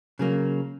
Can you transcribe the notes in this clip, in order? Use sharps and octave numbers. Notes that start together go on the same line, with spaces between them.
C#3 F#3 A#3